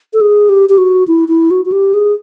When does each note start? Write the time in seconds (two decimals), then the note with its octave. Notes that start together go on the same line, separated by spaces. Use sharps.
0.13 A4
0.21 G#4
0.49 G4
0.69 G4
0.78 F#4
1.07 E4
1.28 E4
1.51 F#4
1.65 F#4
1.72 G4
1.94 G#4